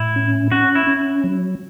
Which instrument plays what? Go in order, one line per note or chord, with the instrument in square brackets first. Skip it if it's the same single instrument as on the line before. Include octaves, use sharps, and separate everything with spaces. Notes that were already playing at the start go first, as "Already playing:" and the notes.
Already playing: [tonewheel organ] A2 [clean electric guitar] E4
[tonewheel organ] C#4
[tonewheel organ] C#4 [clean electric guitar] F#4
[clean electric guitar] E4
[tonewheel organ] C#4
F#3